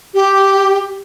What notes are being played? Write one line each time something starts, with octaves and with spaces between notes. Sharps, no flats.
G4